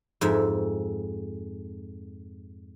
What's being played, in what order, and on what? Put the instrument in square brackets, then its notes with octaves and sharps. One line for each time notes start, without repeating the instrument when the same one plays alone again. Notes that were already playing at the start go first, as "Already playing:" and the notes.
[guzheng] F2 G#2 E5